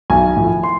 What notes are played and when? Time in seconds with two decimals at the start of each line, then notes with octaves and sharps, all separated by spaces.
0.10 B1 G#5
0.37 A2 F3
0.63 C6